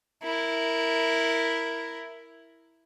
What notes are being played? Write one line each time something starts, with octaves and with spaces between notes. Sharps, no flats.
E4 A#4